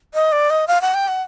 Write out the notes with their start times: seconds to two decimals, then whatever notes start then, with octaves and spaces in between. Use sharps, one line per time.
0.14 D#5
0.32 D5
0.50 D#5
0.68 F5
0.81 F#5
0.94 G5
1.08 F#5